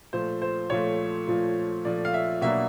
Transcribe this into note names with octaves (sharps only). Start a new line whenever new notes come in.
A#2 F3 A3 C5
C5
A#2 F3 A3 C#5
A#2 F3 A3
A#2 F3 A3 D5
F5
E5
B2 F#3 A#3 D4 E5